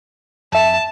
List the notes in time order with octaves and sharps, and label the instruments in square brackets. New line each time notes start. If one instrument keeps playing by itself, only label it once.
[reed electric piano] F2 E5 [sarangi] A5